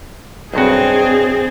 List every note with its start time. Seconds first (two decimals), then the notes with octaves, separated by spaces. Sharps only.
0.54 B1 G2 C4 F#4 G#4